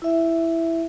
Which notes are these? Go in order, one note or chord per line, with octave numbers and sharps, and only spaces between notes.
E4 E5